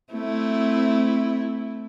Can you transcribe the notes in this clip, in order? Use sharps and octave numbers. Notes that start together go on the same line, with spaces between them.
A3 C4 E4